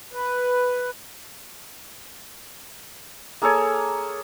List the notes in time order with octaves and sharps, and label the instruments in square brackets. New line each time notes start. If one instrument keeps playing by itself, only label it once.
[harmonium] B4
[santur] A#3 G#4 A4 C#5